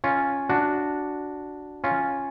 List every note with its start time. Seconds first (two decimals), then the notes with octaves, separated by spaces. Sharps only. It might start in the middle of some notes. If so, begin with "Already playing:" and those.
0.04 C#4 F4
0.49 D4 F#4
1.84 C#4 F4